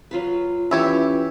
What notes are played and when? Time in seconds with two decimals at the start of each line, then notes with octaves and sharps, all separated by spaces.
0.11 F#3 F4 B4
0.71 E3 C#4 E4 F4 G4 B4 C#5 E5